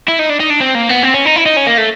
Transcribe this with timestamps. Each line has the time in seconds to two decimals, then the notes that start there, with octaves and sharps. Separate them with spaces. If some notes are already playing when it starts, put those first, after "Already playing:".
0.08 E4
0.19 D#4
0.29 D4
0.40 D#4
0.50 D4
0.60 C4
0.75 A#3
0.89 B3
1.03 C4
1.14 C#4
1.25 D#4
1.36 E4
1.46 D#4
1.57 C#4
1.67 A#3
1.78 A3